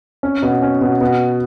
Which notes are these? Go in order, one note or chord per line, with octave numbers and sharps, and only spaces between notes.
C#4
B2
C#4
B2
B2